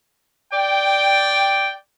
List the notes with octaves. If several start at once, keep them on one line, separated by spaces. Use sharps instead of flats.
D5 G5